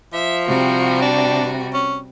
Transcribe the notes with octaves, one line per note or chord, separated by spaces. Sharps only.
F3 E5
C3 G3 F#4
D4
C#4